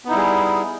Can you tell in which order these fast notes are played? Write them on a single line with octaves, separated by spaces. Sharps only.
B3 D#4 E4 G3 G#4